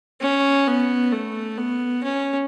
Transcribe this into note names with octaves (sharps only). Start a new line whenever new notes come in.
C#4
B3
A3
B3
C#4